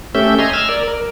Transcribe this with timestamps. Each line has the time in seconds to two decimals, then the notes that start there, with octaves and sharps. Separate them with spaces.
0.15 A3 C#4 G4 E5 G6
0.39 D#5 G#5 A#5 C6
0.53 E6 F6 G#6
0.69 A#4 D5
0.88 A#4